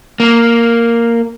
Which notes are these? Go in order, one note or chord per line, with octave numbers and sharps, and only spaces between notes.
A#3